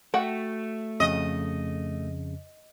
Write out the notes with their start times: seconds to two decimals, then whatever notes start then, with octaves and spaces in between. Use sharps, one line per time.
0.14 A3 F#4 F#5 G5
1.00 F2 C#3 D#5